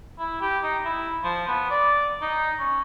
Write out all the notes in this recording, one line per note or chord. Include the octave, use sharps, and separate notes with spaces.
E4
G4
D#4
E4
F3
B3
D5
D#4
C#4